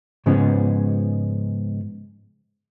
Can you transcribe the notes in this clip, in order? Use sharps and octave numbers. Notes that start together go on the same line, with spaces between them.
G#2 C#3 F3 G#3 B3 C#4